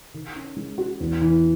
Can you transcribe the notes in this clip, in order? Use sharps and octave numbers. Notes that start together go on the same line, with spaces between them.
D#3
C#4
G#3
F#4
E2
E3